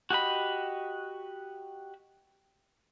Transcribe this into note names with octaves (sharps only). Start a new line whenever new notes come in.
F#4 G4 D#5 B5